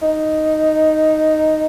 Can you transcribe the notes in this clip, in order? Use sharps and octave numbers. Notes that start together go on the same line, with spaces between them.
D#4